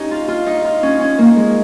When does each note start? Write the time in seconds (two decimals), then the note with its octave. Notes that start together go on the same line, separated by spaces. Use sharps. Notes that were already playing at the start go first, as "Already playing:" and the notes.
Already playing: C#4 D#4 G4
0.11 F4
0.28 F4
0.46 D#4
0.65 F4
0.83 C#4
1.01 C#4
1.18 A#3
1.36 G#3